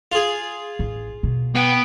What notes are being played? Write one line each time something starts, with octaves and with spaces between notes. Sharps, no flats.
F4 G#4
A1
B2
B3 G5